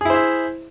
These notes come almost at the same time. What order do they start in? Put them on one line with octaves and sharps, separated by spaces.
G#4 E4 C5 E5